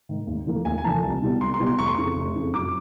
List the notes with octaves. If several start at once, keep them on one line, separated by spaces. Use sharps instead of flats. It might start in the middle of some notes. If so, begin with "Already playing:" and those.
G#2 D#3
D#2
D3 F3 A#3
D#2 G#5
G#5
D3 F3 A#3 A5
C2
B2 G3 B3
C2 C6
C6
B2 G3 B3
C6
F1 C#6
C6
F2 C#3 C#6
F1
F2 C#3
F#2 D6